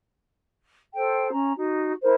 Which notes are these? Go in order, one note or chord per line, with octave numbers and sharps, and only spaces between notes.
A4 C5 G5
C#4 A#5
D#4 F#4
E4 A#4 C5